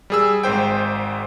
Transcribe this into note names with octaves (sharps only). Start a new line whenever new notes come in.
G3 G#4 E6
G#1 G#2 C5 G5